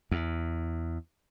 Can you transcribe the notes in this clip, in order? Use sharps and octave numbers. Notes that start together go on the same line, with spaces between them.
E2